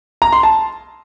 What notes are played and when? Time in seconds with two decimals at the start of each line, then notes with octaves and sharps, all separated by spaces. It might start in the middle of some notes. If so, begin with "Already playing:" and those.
0.22 A#5
0.32 C6
0.43 A5